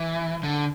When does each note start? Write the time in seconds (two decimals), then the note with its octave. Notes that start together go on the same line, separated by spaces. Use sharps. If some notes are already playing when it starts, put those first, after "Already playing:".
Already playing: E3
0.43 D3